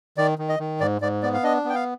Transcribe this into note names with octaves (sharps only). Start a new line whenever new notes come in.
D#3 D5
D#3
D#5
D#3
G#2 D5
G#2 D5
B3 D5
F5
D4 D#5
B3 G5
F5